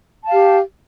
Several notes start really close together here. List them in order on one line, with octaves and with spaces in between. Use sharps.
A5 F5 G4